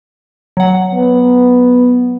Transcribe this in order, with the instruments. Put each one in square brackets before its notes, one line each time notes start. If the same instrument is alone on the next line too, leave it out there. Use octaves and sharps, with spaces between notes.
[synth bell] F#3 F#5
[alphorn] B3